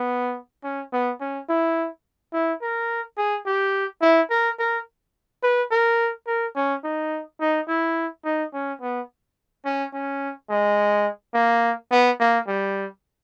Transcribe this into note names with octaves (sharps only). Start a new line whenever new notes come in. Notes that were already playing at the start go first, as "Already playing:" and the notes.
Already playing: B3
C#4
B3
C#4
E4
E4
A#4
G#4
G4
E4
A#4
A#4
B4
A#4
A#4
C#4
D#4
D#4
E4
D#4
C#4
B3
C#4
C#4
G#3
A#3
B3
A#3
G3